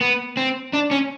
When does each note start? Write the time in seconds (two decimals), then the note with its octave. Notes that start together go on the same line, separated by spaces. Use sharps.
0.01 B3
0.37 C4
0.73 D4
0.91 C#4